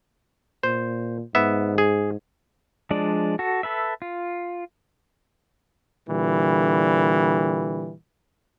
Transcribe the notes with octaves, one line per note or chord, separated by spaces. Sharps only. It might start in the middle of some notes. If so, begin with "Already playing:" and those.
A#2 C5
G#2 B3 E5
G#4
F3 G#3 D4 D5
F#4 A4
A4 B4 E5
F4
A#2 D3 E3 G3